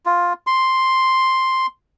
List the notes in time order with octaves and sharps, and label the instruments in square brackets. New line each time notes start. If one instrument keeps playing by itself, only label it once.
[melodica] F4
C6